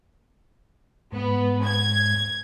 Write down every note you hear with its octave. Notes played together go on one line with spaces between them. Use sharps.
G#2 B3
G#6